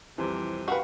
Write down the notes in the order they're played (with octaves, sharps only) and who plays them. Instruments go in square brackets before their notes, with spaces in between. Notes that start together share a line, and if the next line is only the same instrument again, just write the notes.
[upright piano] C2 F2 E3 [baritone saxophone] C3
[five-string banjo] F#4 B4 [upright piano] G4 F5 F#5